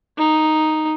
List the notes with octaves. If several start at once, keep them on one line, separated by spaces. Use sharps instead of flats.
D#4